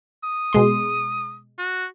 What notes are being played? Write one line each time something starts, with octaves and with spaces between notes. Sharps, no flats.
D#6
B2 G#3 C6
F#4